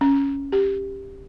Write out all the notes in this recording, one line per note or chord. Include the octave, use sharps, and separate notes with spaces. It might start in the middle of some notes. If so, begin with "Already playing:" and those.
C#4
G4